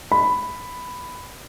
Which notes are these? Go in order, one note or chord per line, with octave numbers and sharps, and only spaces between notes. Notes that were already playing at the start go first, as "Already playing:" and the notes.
B5